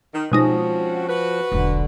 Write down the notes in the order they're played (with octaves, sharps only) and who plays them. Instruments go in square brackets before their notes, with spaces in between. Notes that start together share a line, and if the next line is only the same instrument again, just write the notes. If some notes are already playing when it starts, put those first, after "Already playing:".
[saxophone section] D#3
[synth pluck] B2 G#3 D#4 [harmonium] F3 [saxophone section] C4 C#4 F#4
[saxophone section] F#4 B4
[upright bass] E1 B1 [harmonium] D3